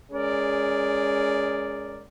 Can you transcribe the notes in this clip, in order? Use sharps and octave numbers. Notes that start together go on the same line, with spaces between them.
G#3 C#4 G#4 A#4 D5